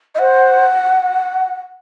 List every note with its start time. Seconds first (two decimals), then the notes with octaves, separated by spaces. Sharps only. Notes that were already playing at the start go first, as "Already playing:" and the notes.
0.15 D#5
0.19 C5 F#5